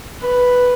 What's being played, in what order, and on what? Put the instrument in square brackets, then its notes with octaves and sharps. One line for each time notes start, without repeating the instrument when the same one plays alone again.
[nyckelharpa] B4